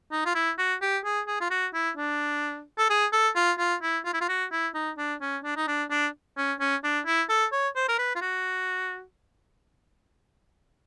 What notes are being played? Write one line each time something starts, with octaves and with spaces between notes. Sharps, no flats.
D#4
F4
E4
F#4
G4
G#4
G#4
F4
F#4
E4
D4
A4
G#4
A4
F4
F4
E4
F4
E4
F4
F#4
E4
D#4
D4
C#4
D4
D#4
D4
D4
C#4
C#4
D4
E4
A4
C#5
C5
A#4
B4
F4
F#4